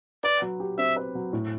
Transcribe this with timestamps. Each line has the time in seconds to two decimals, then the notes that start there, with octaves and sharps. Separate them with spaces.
0.24 B4 D5
0.42 F#3
0.60 G4
0.78 C4 E5
0.96 B4
1.15 F#3
1.33 A2